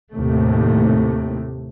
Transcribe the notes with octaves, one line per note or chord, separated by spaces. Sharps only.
D#2 A2 C3 A3